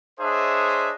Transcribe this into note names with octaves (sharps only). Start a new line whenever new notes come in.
D4 G#4 C5 C#5 D#5 E5